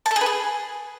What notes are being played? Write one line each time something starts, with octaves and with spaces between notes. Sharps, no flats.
A5
A4
G#4
B4
G#4